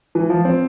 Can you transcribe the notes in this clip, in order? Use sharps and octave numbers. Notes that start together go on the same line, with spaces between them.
E3
F3
C4